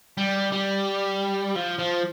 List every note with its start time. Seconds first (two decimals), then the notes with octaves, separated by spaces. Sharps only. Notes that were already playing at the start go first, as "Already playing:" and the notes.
0.18 G3
0.52 G3
1.56 F3
1.79 F3